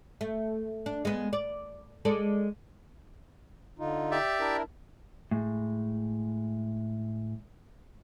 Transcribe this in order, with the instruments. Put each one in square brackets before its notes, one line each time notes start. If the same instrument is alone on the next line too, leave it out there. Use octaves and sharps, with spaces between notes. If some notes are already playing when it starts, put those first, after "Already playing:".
[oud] A3
D4
G#3 B3
D5
G#3 A4 D5
[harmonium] D3 D#4 F4
[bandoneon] G4 D5 E5
[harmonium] D4 E4 A#4
[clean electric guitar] A2 G#3